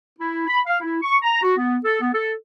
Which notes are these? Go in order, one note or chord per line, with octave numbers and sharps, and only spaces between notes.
E4
B5
F5
E4
C#6
A#5
F#4
B3
A4
B3
A4